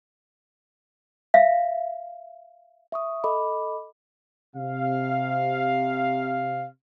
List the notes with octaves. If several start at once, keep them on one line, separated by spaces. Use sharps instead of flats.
E5 F5
E5 C#6 D#6
A4 D#5 B5 D6
C3 F5